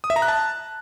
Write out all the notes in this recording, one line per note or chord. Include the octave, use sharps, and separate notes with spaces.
D#6
E5
A#5
F#6
A5